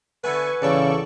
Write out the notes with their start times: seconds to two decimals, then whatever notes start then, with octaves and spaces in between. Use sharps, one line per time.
0.24 D3 A3 B3 B4 G#5 C#6
0.62 A1 E2 C#3 A4 D5 G5 C#6